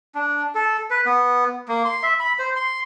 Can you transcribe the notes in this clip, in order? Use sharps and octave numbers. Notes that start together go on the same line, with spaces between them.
D4
A4
B4
B3
A#3
C6
E5
B5
C5
C6